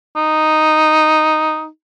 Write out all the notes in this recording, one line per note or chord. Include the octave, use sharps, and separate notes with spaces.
D#4